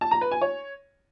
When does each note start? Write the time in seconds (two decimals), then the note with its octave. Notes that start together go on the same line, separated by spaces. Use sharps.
0.01 A5
0.11 A#5
0.21 B4
0.31 G#5
0.41 C#5